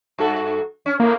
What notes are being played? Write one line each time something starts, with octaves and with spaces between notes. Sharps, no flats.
G2 F#4 A4
C#4
A2 A#3